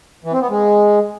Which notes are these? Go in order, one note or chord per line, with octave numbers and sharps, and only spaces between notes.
E3
C4
B3
G#3